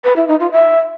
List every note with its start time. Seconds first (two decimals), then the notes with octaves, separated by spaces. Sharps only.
0.04 B4
0.16 E4
0.28 D#4
0.40 F4
0.52 E5